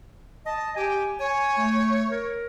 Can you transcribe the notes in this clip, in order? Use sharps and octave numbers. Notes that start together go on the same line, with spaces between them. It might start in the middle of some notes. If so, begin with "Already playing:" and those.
D#5 A5
G4 G#5
C#5 G#5
A3
A#4